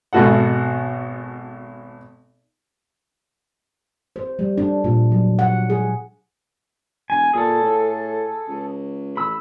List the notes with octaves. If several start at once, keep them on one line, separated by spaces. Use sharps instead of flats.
G#1 B2 F#4 A4 F#5
C5
G3
D4
A#2
F#3
F#5
G#4
E1 G#5
A#2 G#4 A4
A2
C#2
A1 B5 E6